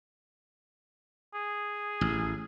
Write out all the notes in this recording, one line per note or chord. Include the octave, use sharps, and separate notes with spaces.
G#4
A1